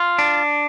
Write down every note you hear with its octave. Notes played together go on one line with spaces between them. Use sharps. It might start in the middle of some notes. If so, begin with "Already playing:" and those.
Already playing: F4
D4